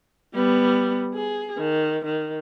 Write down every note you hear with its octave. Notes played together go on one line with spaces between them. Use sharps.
G3 B3
G#4
D#3
D#3